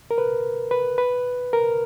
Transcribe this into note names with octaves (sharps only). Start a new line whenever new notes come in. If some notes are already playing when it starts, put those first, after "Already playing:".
A#4
B4
B4
B4
A#4